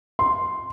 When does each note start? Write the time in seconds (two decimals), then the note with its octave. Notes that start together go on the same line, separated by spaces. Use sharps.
0.19 C6